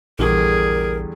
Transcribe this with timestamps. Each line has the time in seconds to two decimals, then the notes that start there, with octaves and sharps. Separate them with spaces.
0.19 A#1 E2 D3 G3 G#4 A#4